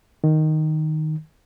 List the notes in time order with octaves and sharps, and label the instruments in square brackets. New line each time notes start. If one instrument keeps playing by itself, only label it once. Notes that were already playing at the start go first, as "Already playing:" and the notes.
[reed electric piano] D#3